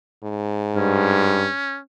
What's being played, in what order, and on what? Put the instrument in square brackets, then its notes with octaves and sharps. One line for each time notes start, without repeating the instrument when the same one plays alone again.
[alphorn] G#2
[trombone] G2 [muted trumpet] C#4